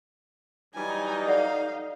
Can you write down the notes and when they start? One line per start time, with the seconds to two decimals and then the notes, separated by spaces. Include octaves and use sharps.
0.75 E3 F#3 G3 D#4 G#5
1.26 A4 D5 F5 F#5